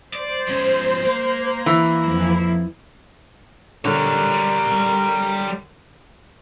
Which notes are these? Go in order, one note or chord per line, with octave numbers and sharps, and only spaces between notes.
C5 D5
F3 C#4
A#3
E3
F2 F3 E4
D3 G3 A#4 C#5